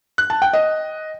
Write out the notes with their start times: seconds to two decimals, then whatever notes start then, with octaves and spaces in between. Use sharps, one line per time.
0.18 F#6
0.30 A5
0.42 G5
0.53 D#5